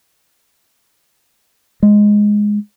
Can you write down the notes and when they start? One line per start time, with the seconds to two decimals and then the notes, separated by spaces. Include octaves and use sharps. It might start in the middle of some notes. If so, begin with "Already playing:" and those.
1.83 G#3